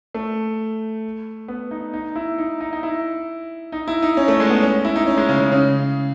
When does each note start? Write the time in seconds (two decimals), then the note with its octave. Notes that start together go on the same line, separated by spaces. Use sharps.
0.14 A3
1.48 B3
1.71 D#4
1.93 D#4
2.16 E4
2.38 D#4
2.60 D#4
2.73 D#4
2.83 E4
3.72 D#4
3.88 E4
4.02 D#4
4.17 C#4
4.28 A3
4.40 G#3
4.50 B3
4.62 C#4
4.85 E4
4.96 D#4
5.07 C#4
5.17 G#3
5.29 C#3
5.40 C#3
5.52 C#3